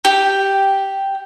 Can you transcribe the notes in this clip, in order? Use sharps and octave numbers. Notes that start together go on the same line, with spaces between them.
G4